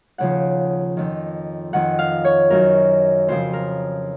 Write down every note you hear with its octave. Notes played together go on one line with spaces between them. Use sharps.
D#2 C#3 F3 F#5
F2 D#3
F2 D#3 F#5
F5
C#5
F#2 D#3 A#4
F2 C#3 F3 C5
A#4